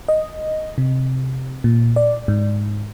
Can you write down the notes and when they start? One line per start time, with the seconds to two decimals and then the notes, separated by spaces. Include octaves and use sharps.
0.09 D#5
0.78 C3
1.64 A#2
1.96 D5
2.28 G#2